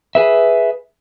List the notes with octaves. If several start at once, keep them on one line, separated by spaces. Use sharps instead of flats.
G#4 B4 E5